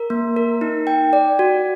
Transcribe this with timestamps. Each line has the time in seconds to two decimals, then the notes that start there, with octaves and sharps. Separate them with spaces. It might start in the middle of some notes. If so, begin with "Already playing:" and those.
Already playing: A#4
0.10 A#3
0.36 A#4
0.61 D#4
0.87 G5
1.13 D5
1.39 F#4